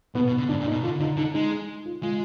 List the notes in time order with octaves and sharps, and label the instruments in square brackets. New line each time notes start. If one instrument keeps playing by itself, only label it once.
[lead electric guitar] B2 [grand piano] B3
[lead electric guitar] B2
D3
[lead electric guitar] G#2 [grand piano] D4
[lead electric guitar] A#2
[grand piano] D#4
[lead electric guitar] B2
[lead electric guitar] D3 [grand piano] F4
[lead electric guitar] D3 [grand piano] D#4
[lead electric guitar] D3 [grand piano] D#4
[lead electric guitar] G#3 [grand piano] D#4
[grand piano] F4
[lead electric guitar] G#3 [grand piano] F4